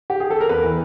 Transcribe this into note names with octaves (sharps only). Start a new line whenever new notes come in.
G4
G#4
A4
A#4
E2 B4
E3